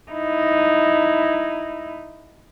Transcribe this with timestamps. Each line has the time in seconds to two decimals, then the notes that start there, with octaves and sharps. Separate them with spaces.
0.11 D#4 E4